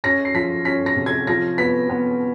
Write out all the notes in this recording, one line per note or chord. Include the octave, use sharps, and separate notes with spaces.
C#4 A#6
C7
F3 B6
C#4 B6
A#6
C3
G#6
F3 A#6
B3 B6
B3